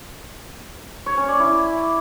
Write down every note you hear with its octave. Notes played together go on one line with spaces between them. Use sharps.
C#5
C#4
D5
E4